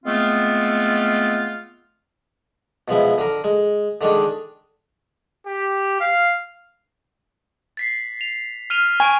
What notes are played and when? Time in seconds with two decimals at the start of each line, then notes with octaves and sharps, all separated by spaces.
0.05 G#3 A3 B3 C4 F4
2.88 B2 F3 G#3 E4
3.18 D3 A#4
3.44 G#3
4.01 D3 D#3 G#3 D4
5.46 G4
6.01 F5
7.77 A6 B6 C7
8.21 F7
8.70 F6 D#7 F7
9.00 G#5 C#6 D7